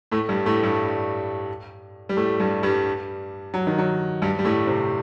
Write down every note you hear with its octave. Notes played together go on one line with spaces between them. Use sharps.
A2 A3
G2 G3
A2 A3
G2 G3
G3
A2 A3
G2 G3
G2 G3
F#3
D#3
F#3
G2 G3
G3
A2 A3
C3 C4